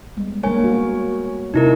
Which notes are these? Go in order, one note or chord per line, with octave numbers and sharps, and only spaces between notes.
G3 G#3 B3
A#3 D4 A#4 C#5 G#5
B3 F#4
C3 C4 D#4 E4 A#4